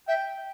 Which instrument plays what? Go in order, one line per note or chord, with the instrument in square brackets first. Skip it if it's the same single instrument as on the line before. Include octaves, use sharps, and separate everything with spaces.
[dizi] E5 [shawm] G5